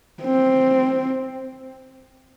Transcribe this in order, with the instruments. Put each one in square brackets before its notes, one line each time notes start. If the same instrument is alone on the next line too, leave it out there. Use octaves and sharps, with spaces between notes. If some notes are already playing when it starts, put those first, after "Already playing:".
[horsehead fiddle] C4